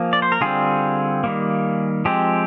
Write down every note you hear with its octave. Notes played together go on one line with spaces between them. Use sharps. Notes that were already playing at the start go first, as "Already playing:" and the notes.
Already playing: F3 A#3 G#4
D5
C5
A#4
D3 G3 C4 F4 G#4
D#3 G3 A#3
F3 G#3 C4 G4